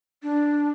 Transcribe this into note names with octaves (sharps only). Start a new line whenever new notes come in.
D4